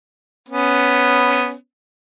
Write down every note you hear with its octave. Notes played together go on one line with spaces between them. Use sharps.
B3 C#4